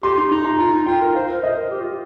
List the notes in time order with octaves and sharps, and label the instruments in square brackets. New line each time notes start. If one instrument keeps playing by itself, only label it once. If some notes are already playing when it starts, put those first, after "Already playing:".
[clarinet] G4 [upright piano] C6
[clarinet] D#4
[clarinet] D#4 [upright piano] C6
[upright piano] A#5
[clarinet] F4 [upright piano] A#5
[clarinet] D#4
[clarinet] F4 [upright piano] G5
[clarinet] A#4
[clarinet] C5 [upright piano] F5
[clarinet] A#4
[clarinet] C5 [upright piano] D#5
[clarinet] A#4
G4
F4